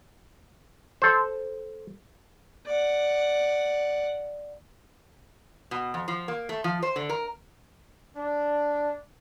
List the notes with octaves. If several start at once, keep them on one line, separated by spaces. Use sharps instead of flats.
A4 C5
D5 F#5
B2
F2
F3
A#3
A3
F3
C5
D3
A#4
D4